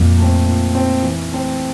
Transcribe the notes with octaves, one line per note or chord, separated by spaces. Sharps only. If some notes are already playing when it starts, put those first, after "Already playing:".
Already playing: F2 A#2
A3 C4
A#2
A3 C4
E3
A3 C4